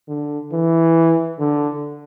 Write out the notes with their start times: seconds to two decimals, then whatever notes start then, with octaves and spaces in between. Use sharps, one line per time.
0.08 D3
0.52 E3
1.39 D3